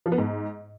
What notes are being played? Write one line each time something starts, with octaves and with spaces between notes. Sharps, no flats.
F3
B3
G#2